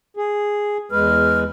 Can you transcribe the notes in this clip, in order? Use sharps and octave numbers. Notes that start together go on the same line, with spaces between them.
G#4
E2 G#3 B4 F6